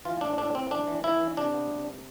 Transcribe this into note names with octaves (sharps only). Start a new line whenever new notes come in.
E3 F4
A2 D4
A2 D4
A2 C4
E3 D4
E3
E3 E4
E3
C3 D4
B3
C3